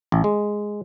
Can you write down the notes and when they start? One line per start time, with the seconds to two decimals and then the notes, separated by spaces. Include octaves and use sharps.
0.12 A1
0.24 G#3